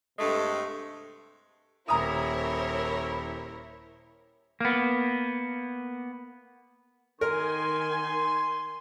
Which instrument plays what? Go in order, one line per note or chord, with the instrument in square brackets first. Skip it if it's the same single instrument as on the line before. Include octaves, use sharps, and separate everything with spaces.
[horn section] G2 C3 G#3 A3
[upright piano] D#1 A#5 D#6 [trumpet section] E4 [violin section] A#4 C5 C#5
[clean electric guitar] A#3 B3
[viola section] D#3 G#5 [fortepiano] A#4 [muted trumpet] C6